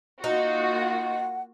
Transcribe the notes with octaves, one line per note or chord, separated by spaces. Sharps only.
A#3 D#4 F4 F#4
F#5